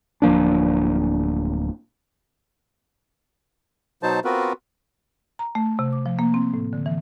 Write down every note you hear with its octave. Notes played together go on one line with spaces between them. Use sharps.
D1 F3 A#3 D4
B2 F#3 D#4 C5 A5
B3 C4 F4 F#4 A#4 B4
A#5
A3
C3
D6
F3
A#3
C4
A2
D3
E3